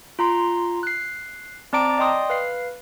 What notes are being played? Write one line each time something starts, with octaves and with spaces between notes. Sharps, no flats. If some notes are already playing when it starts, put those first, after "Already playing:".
F4 A#5 C6
F#6 C7
C4 D5 A5 A#5 D6 D7
D5 D#5 G5 C6 D#6
B4 F5 C7